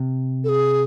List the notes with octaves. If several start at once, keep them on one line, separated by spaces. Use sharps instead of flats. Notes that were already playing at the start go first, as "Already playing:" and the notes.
Already playing: C3
A4
G#4